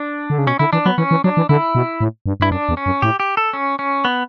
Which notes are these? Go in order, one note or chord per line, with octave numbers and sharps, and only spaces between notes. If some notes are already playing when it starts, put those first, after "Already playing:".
Already playing: D4
D3
C#3
B2 C#4
D3 E4
E3 D4
F#3 B3
E3 C#4
E3
F#3 D4
E3
D3 E4
B2
A2
G2
G2 E4
F#2 D4
E2
C#4
F#2
A2 G4
G4
A4
C#4
C#4
B3